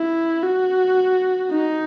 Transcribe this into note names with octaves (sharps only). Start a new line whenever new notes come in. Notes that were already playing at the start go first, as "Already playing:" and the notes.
Already playing: E4
F#4
D#4